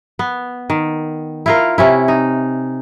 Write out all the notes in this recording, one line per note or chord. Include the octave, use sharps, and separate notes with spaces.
B3
D#3
E4 F4 A#4
C3 C#4 E4
D#4